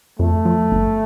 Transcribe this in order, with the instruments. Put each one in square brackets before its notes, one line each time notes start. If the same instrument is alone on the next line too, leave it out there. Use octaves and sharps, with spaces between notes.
[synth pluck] F2 [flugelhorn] A3
[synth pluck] F3
G1